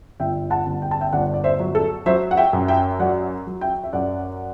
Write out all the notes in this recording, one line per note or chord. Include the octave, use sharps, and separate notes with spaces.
G1 E5 G5
F#5 A5
G1
G5
A5
E5 G5
G1 D5 F#5
D5
C5 E5
F#3
A4
F#3 C5 E5
F#5
E5 G5
F#2
E5 G5
F#3 D5 F#5
F#3
E5 G5
E5
F#2 D5 F#5